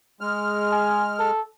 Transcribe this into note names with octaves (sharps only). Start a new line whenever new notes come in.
G#3 F6
G#5
A4